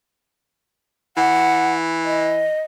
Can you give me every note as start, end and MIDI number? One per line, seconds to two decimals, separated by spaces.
1.17 2.48 52
1.17 1.73 78
2.05 2.60 75